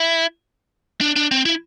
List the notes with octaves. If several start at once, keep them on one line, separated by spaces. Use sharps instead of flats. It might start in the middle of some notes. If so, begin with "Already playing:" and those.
Already playing: E4
D4
D4
C4
E4